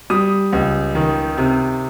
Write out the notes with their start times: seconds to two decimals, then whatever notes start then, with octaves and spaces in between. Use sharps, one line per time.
0.10 G3 D#6
0.53 C#2
0.95 D#3
1.37 C3